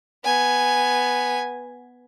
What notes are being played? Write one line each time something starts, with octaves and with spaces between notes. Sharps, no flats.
B3 G#5